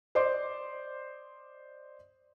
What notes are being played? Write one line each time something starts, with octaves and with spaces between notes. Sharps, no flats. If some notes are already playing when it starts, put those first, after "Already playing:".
C5 D5 D#5 C6 D6